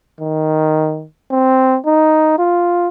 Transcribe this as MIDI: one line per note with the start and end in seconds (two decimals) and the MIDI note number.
0.21 1.06 51
1.31 1.78 60
1.86 2.36 63
2.39 2.88 65